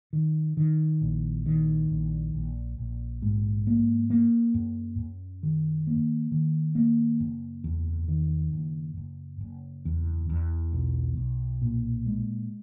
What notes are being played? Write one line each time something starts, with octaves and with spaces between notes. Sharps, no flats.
D#3
D#3
A#1
D#3
A#1
A#1
A#1
G#2
A#3
A#3
F#2
F#2
D#3
A#3
D#3
A#3
F#1
E2
D#3
F#1
F#1
F#1
E2
E2
B1
B1
A#2
G#3